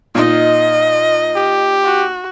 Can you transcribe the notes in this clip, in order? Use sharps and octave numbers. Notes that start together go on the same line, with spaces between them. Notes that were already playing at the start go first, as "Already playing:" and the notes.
A#2 D#4 D#5
G4
F#4